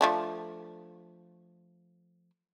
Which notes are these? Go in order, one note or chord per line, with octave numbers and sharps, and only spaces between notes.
F3 A3 D4